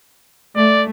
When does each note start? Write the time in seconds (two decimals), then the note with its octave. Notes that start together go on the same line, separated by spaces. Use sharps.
0.57 A3 D5